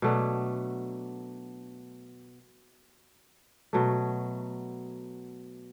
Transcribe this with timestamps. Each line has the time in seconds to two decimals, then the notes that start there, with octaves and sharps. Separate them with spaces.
0.02 B2 F#3 A3 D4
3.73 B2 F#3 A3